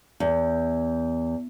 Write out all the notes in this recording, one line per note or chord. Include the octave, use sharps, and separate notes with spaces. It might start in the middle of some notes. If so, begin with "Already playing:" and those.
E2